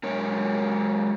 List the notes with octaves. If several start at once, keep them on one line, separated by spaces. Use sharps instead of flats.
F#3 G#3 A#4 C#5